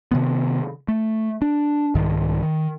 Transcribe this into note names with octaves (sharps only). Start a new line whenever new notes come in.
C3 D#3 B3
A3
D4
C2 G#2 D#3
D#3